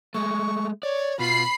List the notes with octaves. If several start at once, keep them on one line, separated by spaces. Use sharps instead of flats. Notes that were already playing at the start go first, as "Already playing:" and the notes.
G#3 A3 C#6
C#5 D5
B2 F4 B5 C7